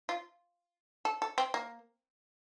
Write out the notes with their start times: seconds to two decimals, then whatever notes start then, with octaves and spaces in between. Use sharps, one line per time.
0.09 F4
1.05 A4
1.22 A4
1.38 C4
1.54 A#3